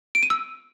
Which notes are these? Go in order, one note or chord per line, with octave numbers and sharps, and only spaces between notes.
D7
D#7
E6